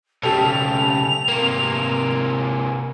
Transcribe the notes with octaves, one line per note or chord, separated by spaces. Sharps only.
B1 C#3 G4 A4 F7
C3 A#3